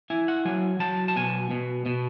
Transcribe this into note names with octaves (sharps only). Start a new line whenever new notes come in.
E4 G#5
F#5
F#3 G#5
F#3 A5
A5
B2 G#5
B2
B2